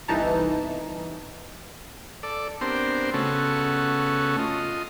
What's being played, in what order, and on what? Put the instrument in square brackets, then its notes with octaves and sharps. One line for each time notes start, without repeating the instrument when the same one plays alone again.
[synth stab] G1 C2 E3 D#4 A5 A#5
[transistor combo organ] A4 D5
B3 C4 D4 G4 A#4 C5
C#3 A3 B3 C#4 F#4 A4
F4 D#5